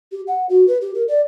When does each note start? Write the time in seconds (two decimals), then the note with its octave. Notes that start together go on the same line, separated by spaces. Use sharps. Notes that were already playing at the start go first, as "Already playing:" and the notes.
0.12 G4
0.27 F#5
0.49 F#4
0.68 B4
0.81 G4
0.94 A#4
1.08 D5